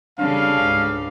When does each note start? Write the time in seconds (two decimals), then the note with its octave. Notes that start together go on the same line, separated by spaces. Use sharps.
0.19 C#3 G3 D4 A4 F5
0.54 C#2 G#2